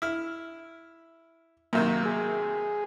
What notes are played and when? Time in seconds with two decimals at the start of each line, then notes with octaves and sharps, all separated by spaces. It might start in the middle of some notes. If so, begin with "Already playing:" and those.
0.02 E4 F6
1.73 F#2 C3 D#3 A#3
2.05 G#4